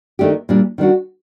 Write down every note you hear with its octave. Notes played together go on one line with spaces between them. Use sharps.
D#3 A3 D4 G4
A#2 G3 D4
D#3 G3 D4 F#4